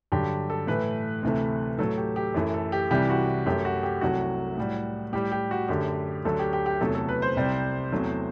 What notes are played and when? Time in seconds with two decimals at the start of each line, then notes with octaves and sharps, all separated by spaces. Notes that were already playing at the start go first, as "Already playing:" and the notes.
0.12 G2 D3 F#3 G4
0.50 A4
0.67 A2 E3 A3 B4
1.23 D2 C3 E3 A3
1.78 A2 F#3 A3 A4
1.97 G4
2.16 G4
2.34 F#2 E3 A3
2.54 A4
2.72 G4
2.90 C2 C3 E3 G3 G4
3.10 F#4
3.46 F#2 F#3 A3 G4
3.65 F#4
3.83 G4
4.01 C2 C3 F#3 A3 F#4
4.57 A2 G3
5.13 A2 G3 G4
5.32 G4
5.51 F#4
5.68 F#2 D3 A3 G4
6.25 D2 D3 F#3 A3 A4
6.39 G4
6.53 G4
6.66 G4
6.81 E2 C3 F#3 A3 A4
6.95 A4
7.09 B4
7.22 C5
7.37 C2 C3 G3
7.92 E2 C3 F#3 A3